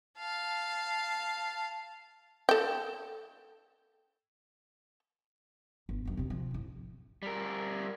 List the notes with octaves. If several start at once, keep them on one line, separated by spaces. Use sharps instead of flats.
F5 A5
A4 G5
G1
G1 F#2
C3 C4
F3
G#2 E4
G3 A#4